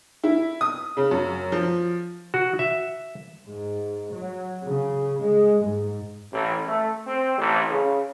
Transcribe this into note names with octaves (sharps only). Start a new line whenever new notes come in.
E4
D#6
C#3
F#2
F3
F#4
E5
G#2
F#3
C#3
G#3
G#2
A1
A3
C4
A1
C#3